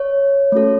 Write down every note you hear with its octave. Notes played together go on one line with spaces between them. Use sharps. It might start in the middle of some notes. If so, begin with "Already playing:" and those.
Already playing: C#5
A3 C#4 F#4 A4